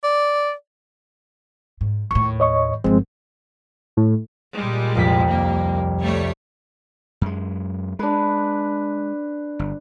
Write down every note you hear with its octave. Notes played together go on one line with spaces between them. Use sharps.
D5
G#2
D#2 A2 C#6
C#5 D#5 C#6
G1 F#2 F3 G#3 C4
A2
A#2 G3 G#3
C2 F2 B6
D#2 A#3
G3 A3 C#5
F#2 G#3
G#3 D4 B4
G1